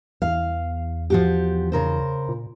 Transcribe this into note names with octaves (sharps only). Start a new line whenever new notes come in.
E2 F5
F3 F#4 G4
C#3 A#4 C5
A#2